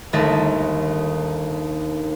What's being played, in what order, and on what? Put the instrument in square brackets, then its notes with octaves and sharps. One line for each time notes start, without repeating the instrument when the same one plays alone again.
[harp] G1 D#2 D#3 A3 A4 D#5